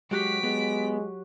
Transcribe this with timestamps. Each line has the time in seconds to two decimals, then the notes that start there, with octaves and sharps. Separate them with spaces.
0.11 F#3 G#3 F#4 G4 B6 D7
0.43 G#3 B3